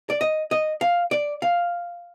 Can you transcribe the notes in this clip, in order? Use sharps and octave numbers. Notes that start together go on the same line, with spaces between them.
D5
D#5
D#5
F5
D5
F5